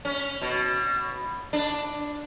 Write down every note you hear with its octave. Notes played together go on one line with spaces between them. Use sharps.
C#4
B2
D4